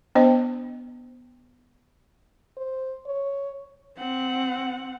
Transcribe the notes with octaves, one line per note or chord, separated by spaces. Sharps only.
B3 D4 C5 D#5
C5
C#5
C4 F#5